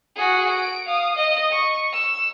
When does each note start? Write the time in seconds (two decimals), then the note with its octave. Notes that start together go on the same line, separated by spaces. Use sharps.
0.16 F#4 G#4
0.50 D7
0.87 F5 D#6
1.16 D#5
1.52 C#6
1.93 E6